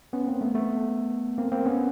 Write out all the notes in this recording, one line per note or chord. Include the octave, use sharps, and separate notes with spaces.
B3 C#4
A#3 C4
A3 B3
A3 B3
A#3 C4
A#3 C4
B3 C#4